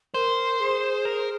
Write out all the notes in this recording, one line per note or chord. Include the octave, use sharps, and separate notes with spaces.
A#4 C5
G#4
A#4